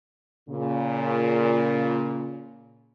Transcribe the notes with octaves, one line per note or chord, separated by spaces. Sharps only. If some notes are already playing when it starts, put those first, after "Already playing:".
A#2 C#3